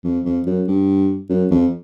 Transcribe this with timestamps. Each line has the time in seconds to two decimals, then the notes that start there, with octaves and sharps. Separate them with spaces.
0.04 F2
0.25 F2
0.46 F#2
0.68 G2
1.30 F#2
1.51 F2